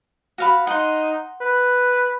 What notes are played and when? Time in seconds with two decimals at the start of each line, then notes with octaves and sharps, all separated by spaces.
0.38 F#4 F5 B5
0.67 D#4 F#5 C6
1.41 B4